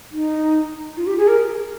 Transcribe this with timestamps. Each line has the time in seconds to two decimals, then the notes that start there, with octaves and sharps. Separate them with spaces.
0.11 D#4
0.96 F4
1.06 G4
1.17 G#4
1.27 A#4